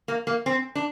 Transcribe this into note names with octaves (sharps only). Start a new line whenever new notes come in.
A#3
A#3
C4
D4